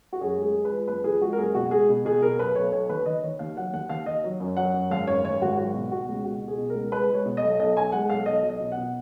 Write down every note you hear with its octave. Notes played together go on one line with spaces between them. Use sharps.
F#4
F#2 G#4
G#3
G#4
G#3
B4
F3
F#1 B4
F3 G#4
G#3 F#4
A#4
F#1 G#4
B2 F#4
G#3 G#4
B2
B2 G#4
B2 A#4
B1 B4
B1 C#5
B1 C#5
D#2 B4
D#3 D#5
D#3 C#5
D#2 F5
F#3 F#5
D#2 F#5
D#2 F5
D#2 D#5
F#3
F#2
F#3 F#5
F#2
G#1 F5
F#2 C#5
G#1 C#5
G#1 F#4
F#3 F#4
B2
B2 F#4
C#2
B2 F#4
B2
G#4
B2
A#4
C#2
G#3 B4
G#3 C#5
B2
D#5
B1
B1 D#5
B1 G#5
G#3 F#5
B1 F5
B1 D#5
F#3
D#5
B2
F#5
B2